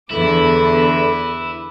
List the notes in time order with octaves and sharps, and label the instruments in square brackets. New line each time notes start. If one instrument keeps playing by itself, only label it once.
[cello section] E2 D3 [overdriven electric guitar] E4 [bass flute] A4 [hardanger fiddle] B4 D6